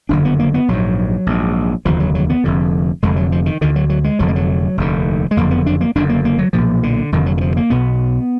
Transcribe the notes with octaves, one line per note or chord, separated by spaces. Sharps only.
F#1 F2 D3 D4
B3
A#3
B3
A#1 G#2 F#3
A#1 G#2
F1 D#2 D3 F3
F#3
F#3
B3
F1 F2 D3
F1 F2 D3 G#3
F#3
F3
D#3
D2 D3 D#3
F#3
F#3
G#3
F1 F2 D3 F#3
G#3
F#3
F1 D#2 D3
G#3
F#1 F2 D3 A#3
B3
D4
A#3
F#1 F#2 D3 D4
A#3
A#3
F#3
B1 A#2 F3
D3
F1 F2 D3 D#3
F#3
D#3
F3
A#3
B1 B2 B3